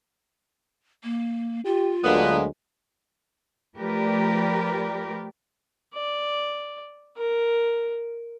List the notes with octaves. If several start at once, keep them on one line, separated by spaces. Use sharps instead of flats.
A#3
F4 G4
D2 D3 F#3 G#3 A#3 B3
F3 A3 G4 A#4 B4 D5
D5
A#4